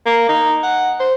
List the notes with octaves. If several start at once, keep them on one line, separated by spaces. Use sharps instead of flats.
A#3
D#4
F#5
C5